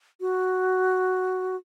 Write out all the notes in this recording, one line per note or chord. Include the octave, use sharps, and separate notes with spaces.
F#4